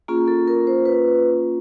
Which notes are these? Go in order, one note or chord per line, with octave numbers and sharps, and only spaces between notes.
A#3 C#4 F4 G#4
A4
A#4
C5
B4